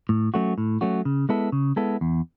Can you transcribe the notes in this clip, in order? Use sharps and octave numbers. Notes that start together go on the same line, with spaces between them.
A2
F#3 A3 C#4 F#4
A2
F#3 A3 C#4 F#4
C#3
G#3 B3 E4 A4
C#3
G#3 B3 E4 A4
E2